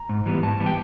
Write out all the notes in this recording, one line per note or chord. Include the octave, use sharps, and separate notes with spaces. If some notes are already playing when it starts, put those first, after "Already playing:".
Already playing: A#5
G#2
E3 G3 B3
G#2 A5
E3 G3 B3
G5